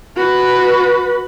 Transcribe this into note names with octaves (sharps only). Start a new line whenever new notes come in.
F#4 B4